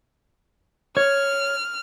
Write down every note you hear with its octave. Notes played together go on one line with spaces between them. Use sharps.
C#5 F6